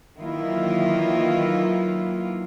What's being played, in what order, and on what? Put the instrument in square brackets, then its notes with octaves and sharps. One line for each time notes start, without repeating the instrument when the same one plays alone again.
[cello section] D#3 E3 F#3 A#3 E4 F4